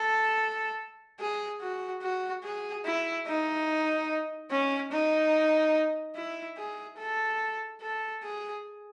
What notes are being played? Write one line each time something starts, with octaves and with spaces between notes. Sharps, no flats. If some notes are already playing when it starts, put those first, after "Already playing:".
Already playing: A4
G#4
F#4
F#4
G#4
E4
D#4
C#4
D#4
E4
G#4
A4
A4
G#4